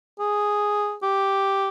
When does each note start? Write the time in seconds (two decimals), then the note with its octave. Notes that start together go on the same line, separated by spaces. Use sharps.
0.19 G#4
1.03 G4